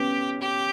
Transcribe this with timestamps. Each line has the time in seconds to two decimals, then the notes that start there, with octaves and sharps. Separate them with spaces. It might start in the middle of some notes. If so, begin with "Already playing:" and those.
Already playing: B3 C#4 G4
0.41 G4